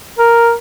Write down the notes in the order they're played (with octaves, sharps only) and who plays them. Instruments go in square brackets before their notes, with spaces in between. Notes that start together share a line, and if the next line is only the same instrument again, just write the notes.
[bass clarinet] A#4